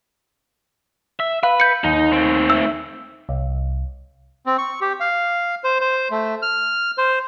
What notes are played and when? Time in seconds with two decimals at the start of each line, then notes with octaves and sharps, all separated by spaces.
1.20 E5
1.43 B4 F5
1.60 G6 C#7
1.84 D#2 D#4
2.13 A3 C4
2.50 E5 E6
3.29 C2
4.46 C4
4.58 C#6
4.81 G4
5.00 F5
5.64 C5
5.81 C5
6.11 A3
6.42 F6
6.98 C5